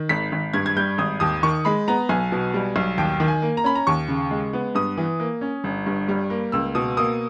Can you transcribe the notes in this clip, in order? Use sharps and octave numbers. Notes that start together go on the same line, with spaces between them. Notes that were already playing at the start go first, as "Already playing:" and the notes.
Already playing: D#3
G#1 B6
G#1
G2 G#6
G#6
G3 G6
G#1 D#6
D#2 D#6
D#3 C#6
G#3 B5
B3 A#5
B1 G#5
B2
G3
B1
D#2 G5
D#3
G#5
A#3
A#5
C#4 B5
A#5
D#2 C#6
C#3
G#3
B3
G2 D#6
E3
A#3
C#4
G1
G2
G3
A#3
C#2 E6
B2 D#6
A#3 D#6